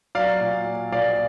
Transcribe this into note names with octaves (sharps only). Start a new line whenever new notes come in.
F#3 D5 F5
A#2
A#2
A#1 D5 F5